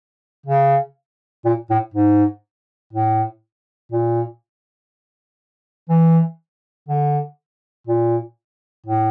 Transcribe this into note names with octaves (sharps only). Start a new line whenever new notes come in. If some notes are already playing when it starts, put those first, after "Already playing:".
C#3
A#2
A2
G#2
A2
A#2
E3
D3
A#2
A2